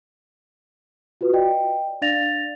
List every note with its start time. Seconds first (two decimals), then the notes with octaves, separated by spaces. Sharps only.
1.21 F4 F#4 B4
1.33 D5 D#5 G5
2.02 D4 D5 F5 A6 A#6 F7